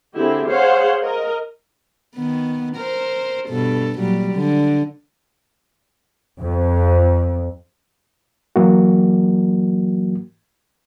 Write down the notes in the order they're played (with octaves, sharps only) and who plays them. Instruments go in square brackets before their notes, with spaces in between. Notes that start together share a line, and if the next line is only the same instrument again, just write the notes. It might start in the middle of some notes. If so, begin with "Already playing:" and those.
[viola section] D3 C4 E4 G4 G#4
G#4 C5 C#5 F5 F#5
A#4 D#5
[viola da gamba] D#3 B3
A#4 C5
G2 B2 A4
A#2 F#3 G3
D3
[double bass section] F2
[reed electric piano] E3 F#3 A#3 F#4